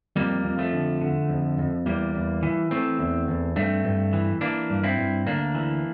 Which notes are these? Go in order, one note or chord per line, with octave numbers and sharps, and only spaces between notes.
F2 G3 A#3
F2
F3 A3
D3
D3
F2
F2
E2 G3 A#3
E2
E3
E3 A3 C4
E2
E2
G2 A3 C4
G2
E3
E3 A#3 D4
G2
C4 E4
G2
D2 A#3 D4
E3